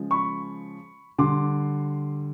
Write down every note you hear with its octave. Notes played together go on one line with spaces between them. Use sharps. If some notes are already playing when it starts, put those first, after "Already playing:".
Already playing: C#3 F3 G#3
B5 C#6
D3 G3 C6 D6